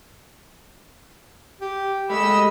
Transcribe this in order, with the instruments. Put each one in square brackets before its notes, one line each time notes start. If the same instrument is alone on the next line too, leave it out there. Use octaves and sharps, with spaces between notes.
[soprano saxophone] G4
[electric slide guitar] G#3 A3 G4 [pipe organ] D#5 E6 [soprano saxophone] B5